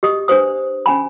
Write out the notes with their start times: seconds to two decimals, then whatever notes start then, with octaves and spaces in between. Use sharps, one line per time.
0.03 G4 D#5 D#6
0.28 D4 G4 B4 C5 D#6
0.86 C#4 G#5 B5